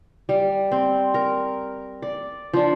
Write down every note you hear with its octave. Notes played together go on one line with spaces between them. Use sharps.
G3
C4
A#4
D5
F3 D4